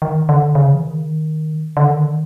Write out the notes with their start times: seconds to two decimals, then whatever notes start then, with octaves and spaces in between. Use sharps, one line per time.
0.02 D#3
0.29 D3
0.55 C#3
0.74 E3
0.82 D#3
1.77 D3
1.88 D#3